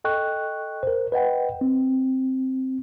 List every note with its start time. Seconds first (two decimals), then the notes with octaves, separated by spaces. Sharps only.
0.04 A4 D#5 G5 C#6 F#6
0.83 A#4 C5
1.12 B4 D#5 F#5 G5
1.61 C4